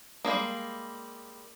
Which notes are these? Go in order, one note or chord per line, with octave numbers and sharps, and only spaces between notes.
G3 G#3 A#3